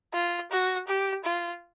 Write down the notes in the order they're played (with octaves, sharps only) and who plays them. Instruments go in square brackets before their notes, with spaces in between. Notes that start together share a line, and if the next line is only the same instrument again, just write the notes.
[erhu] F4
F#4
G4
F4